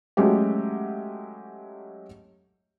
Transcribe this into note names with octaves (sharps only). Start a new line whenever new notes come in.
F#3 G#3 A3 C#4 G4